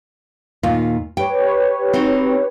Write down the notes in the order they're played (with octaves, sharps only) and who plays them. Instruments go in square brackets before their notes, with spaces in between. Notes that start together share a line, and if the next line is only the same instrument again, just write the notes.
[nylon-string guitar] D#2 A#2 F4
[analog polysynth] G4 B4 C#5 [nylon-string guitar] G5
[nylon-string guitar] C4 D#4 F#4